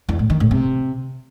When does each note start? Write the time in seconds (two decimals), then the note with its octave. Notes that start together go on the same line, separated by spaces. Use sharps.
0.09 E2
0.19 A2
0.30 D#3
0.40 A2
0.51 C3